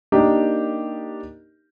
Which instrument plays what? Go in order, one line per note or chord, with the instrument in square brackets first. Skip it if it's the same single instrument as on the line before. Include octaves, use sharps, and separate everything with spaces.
[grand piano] A#3 D4 D#4 G4 A#4 D#5